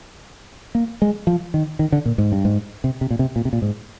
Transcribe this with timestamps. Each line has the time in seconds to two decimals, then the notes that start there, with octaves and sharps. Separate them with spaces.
0.75 A#3
1.02 G#3
1.27 F3
1.54 D#3
1.79 D#3
1.92 D3
2.06 A#2
2.18 G#2
2.32 G2
2.45 G#2
2.84 C3
3.01 C3
3.11 A#2
3.19 C3
3.36 A#2
3.45 C3
3.53 A#2
3.62 G#2